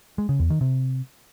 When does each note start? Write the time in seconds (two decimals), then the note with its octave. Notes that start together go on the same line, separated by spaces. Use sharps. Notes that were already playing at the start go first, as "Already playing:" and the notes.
0.18 G#3
0.29 C#3
0.40 E2
0.50 D#3
0.61 C3